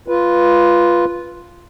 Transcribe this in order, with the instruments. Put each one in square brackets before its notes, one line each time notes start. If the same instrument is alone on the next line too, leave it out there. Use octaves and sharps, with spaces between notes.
[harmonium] F4 B4